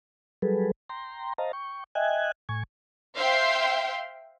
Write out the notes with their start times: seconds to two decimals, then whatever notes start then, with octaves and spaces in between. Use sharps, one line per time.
0.42 F#3 G3 G#4 A4 B4
0.89 G5 A#5 C6
1.38 C5 D#5 F5 A5 A#5
1.53 G5 C#6
1.95 D#5 E5 G5 G#5 F#6 G#6
2.49 A2 G#5 C#6 G#6
3.15 C5 E5 F5 G5 C6